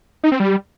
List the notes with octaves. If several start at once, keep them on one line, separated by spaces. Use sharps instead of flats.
D#4
C4
G3